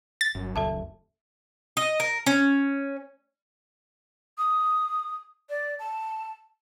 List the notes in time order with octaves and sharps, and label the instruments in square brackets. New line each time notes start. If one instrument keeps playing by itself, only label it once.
[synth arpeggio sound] A6
[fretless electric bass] G1 [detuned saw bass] F#2
[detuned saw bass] D#1 [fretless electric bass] C#2 F#2 [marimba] A4 E5 A5
[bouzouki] D#5
A#4
C#4
[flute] D#6
D5
A5